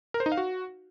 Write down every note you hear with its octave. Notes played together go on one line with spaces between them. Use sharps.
A#4
C5
D#4
F5
F#4